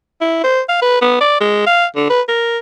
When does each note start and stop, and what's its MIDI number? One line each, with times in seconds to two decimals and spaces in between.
0.21 0.43 64
0.44 0.61 72
0.69 0.77 77
0.82 0.99 71
1.02 1.18 59
1.21 1.40 74
1.41 1.62 56
1.67 1.86 77
1.96 2.09 50
2.10 2.21 71
2.28 2.58 70